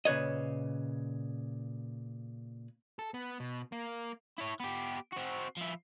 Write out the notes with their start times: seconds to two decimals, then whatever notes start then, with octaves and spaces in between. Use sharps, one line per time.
0.05 A#2 C#3 B4 C#5 D#5
2.99 A4
3.14 B3
3.40 B2
3.72 A#3
4.38 E4 C#5
4.60 B3 G4
5.12 C4 F#4
5.57 F3 E4